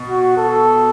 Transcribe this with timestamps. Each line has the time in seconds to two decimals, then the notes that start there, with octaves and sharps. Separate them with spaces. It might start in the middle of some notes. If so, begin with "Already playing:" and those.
Already playing: B2
0.09 F#4
0.37 A4